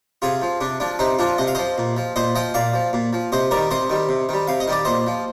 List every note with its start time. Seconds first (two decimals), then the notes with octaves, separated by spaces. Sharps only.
0.22 C3 F4 G#4
0.42 F3
0.61 C3 D4
0.80 F3 D4
0.99 C3 C4 D#4
1.19 F3 D4 F4
1.38 C3 D#5
1.47 F5
1.55 F3 C5 D#5
1.78 A#2
1.97 F3
2.16 A#2 C5 D#5
2.35 F3 D#5 G5
2.54 A#2 D5 F5
2.74 F3
2.93 A#2
3.13 F3
3.32 C3 C5 D#5
3.51 D#3 G3 A#4 D5
3.71 C3 C5 D#5
3.90 D#3 G3
4.09 C3
4.29 D#3 G3
4.48 C3 F5
4.60 D#5
4.68 D#3 G3 D5
4.85 A#2 C5 D#5
5.07 F3